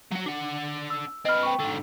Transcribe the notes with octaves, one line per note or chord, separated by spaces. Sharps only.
F#3 F#4
D4 F#5
E6
C4 B4 D#5 F6
G5 C#6
G#2 D3